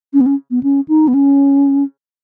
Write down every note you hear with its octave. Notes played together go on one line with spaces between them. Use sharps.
C#4
B3
C#4
B3
C#4
D#4
B3
C#4